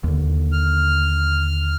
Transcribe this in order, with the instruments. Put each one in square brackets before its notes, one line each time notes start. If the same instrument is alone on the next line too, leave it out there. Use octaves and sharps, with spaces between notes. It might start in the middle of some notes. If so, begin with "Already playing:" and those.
[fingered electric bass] D#2 D3
[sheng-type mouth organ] F6